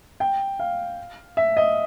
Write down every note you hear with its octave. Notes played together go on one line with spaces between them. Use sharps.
G5
F5
E5
D#5